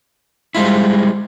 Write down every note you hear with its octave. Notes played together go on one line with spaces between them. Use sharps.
G#2 G3 G#3 E4 F4